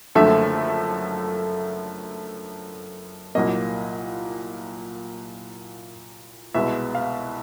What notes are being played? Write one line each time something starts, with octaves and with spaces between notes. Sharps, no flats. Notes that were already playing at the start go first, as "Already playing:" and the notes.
F#1 F#2 D3 F3 A3 E5
C2 A#2 F#3 A#3 D#5
C2 B2 G#3 B3 E5
F5